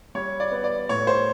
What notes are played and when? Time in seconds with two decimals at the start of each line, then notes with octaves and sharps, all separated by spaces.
0.15 G3 C#5
0.40 D5
0.51 B3
0.64 D5
0.89 A2 C#5
1.07 C5